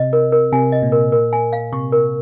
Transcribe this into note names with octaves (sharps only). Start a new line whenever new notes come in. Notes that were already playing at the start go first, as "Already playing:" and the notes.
Already playing: C3 D#5
A#4
A#4
C3 G#5
D#5
A#2
A#4
A#4
G#5
F5
C3 C#6
A#4